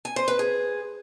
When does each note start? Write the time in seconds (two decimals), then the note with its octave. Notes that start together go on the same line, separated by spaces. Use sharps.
0.05 G#5
0.16 C5
0.28 B4
0.39 G#4